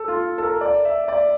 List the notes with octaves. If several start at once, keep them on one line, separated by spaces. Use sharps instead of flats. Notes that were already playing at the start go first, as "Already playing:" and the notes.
Already playing: A4
F4
A4
A#4
D5
E5
D5